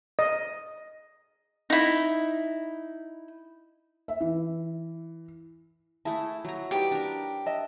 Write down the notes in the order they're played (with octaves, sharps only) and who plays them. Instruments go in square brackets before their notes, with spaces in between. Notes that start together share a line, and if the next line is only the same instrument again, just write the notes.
[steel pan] D#5
[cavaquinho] D#4 E4
[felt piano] E5
E3
[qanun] A3 E4 [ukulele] G#4 E5 A5
[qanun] F#3 A#5
[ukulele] D#4 B4 [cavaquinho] G4 [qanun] D5
[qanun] D4 A#4
[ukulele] D#5 E5 A5